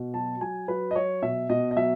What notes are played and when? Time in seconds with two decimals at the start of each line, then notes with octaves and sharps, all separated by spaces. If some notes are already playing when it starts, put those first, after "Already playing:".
Already playing: B2
0.14 F#3 A5
0.41 F#3 G#5
0.68 F#3 B4
0.91 D#5
0.95 F#3 C#5
1.22 B2 E5
1.50 B2 D#5
1.71 D#5
1.76 F#3 E5